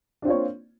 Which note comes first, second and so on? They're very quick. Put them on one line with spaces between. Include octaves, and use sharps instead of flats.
D4 C4 F4 C#5 A#3